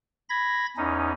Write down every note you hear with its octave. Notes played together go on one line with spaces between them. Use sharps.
B5 G#6 A#6
E2 C#4 D#4